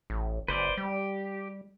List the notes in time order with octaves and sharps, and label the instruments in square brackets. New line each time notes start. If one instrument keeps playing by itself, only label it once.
[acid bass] A1
[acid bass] F#1 [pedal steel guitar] B4 C5 D5
[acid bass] G3 [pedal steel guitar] G4